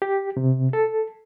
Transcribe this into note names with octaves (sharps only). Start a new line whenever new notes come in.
G4
C3
A4